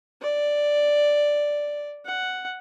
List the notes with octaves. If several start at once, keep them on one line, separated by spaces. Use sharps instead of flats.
D5
F#5